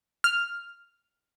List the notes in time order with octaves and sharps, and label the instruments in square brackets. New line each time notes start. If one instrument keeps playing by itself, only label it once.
[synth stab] F6